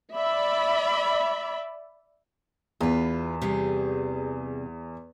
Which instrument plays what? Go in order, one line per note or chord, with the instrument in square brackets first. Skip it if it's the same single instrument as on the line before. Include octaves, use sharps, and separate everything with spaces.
[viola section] D5 E5 B5
[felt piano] E2 [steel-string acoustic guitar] F4 B4
[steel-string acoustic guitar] C3 G3 G#4